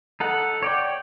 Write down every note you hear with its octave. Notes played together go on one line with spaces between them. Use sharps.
D#4 A4 F#5
C#5 D5 G5